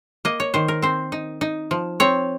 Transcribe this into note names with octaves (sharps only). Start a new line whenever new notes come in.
A#3 D#5
C#5
D#3 C5
A#4
C4 C5
D#4
D#4
F3
C4 C#5